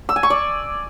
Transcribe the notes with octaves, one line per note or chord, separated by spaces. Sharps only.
E6
G#5
C#6
D5